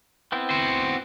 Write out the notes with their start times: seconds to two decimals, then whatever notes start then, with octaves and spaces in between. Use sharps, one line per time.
0.32 B3 C4 E4
0.50 F#4 C5